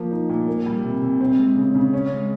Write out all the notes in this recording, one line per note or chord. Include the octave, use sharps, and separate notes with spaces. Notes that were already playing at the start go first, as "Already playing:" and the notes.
Already playing: F3 A#3
D#4
A#2
A#3
G3
C3
C3
C4
G#3
C#3
C#3
C#4
G#3